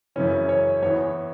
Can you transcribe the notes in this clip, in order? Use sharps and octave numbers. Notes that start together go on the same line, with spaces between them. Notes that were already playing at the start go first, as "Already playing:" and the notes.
F#2 C#3 E3 C#4
C#5
E2 E3 C#5